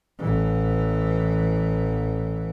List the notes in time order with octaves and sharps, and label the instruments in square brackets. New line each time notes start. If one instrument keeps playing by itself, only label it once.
[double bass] A1 E3